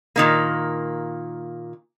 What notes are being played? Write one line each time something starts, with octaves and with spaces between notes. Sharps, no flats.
A#2 D#3 A#3